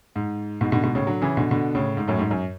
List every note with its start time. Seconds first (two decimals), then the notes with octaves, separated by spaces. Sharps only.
0.16 G#2
0.61 G#2 B2
0.72 B2 D3
0.84 G#2 B2
0.95 A2 C#3
1.07 D3 F#3
1.22 C#3 E3
1.37 B2 D3
1.51 B2 D3
1.75 A2 C#3
1.97 G#2
2.08 F#2 A2
2.19 G#2
2.31 F#2